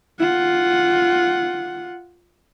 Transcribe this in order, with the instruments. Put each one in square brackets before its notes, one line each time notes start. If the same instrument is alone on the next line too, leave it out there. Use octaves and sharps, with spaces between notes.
[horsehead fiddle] F4 F#5